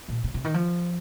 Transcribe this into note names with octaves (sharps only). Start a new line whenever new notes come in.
A#2
C3
C3
D#3
F3